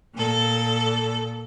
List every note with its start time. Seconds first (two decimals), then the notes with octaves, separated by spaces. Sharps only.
0.14 A#2 A4